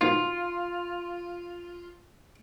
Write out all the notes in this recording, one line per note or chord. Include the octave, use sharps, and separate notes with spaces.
G#2 B2 D#3 F4